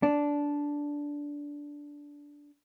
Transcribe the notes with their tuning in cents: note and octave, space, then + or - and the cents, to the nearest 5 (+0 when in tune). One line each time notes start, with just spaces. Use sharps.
D4 -10